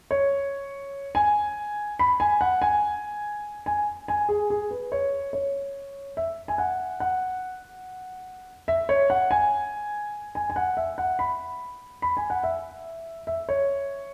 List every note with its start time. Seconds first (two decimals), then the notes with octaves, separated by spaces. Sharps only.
0.11 C#5
1.15 G#5
1.99 B5
2.20 G#5
2.41 F#5
2.62 G#5
3.66 G#5
4.08 G#5
4.29 G#4
4.50 G#4
4.71 B4
4.92 C#5
5.33 C#5
6.17 E5
6.48 G#5
6.58 F#5
7.00 F#5
8.68 E5
8.89 C#5
9.10 F#5
9.31 G#5
10.35 G#5
10.50 G#5
10.56 F#5
10.77 E5
10.98 F#5
11.19 B5
12.02 B5
12.17 G#5
12.30 F#5
12.43 E5
13.27 E5
13.49 C#5